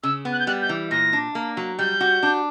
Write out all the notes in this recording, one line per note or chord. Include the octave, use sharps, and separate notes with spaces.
C#3 E6
B3
F#6
G6
G3 F#6
G6
E3
A#2 A#6
D4
A#3
F#3
G3 G6
F#4
D4